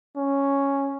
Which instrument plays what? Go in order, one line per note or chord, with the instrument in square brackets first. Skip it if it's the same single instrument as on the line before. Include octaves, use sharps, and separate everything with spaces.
[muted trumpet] C#4